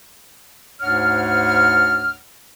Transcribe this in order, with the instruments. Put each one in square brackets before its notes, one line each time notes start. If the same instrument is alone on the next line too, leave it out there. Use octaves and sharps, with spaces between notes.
[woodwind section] D2 G#2 D4 C#5 F#5 F6